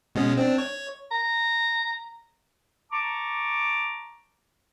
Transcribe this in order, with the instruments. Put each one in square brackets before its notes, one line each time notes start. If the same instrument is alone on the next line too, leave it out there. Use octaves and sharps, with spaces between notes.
[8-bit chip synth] B2 G#3 C#4
C4 D4
C#5
[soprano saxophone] A#5
[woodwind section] A5 A#5 C#6 D6